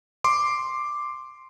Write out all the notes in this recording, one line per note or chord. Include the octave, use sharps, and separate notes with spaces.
C6 D6